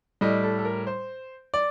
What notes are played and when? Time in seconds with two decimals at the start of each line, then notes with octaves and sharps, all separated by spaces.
0.21 A2 G3 D#5
0.43 A4
0.59 A4
0.65 A#4
0.87 C5
1.54 D5